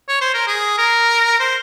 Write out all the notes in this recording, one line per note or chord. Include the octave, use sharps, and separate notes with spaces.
C#5
C5
A#4
G#4
A#4
C5